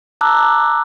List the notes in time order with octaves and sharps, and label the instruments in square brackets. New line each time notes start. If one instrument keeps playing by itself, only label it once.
[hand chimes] A5 A#5 D6 E6 F#6